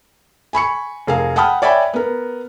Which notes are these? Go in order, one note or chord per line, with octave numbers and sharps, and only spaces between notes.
G#5 B5 C#6 C#7
F1 G#4 A#4 F5
F#5 G5 A5 B5 D#6 F6
C#5 D5 E5 G5 G#5 B5
B3 A#4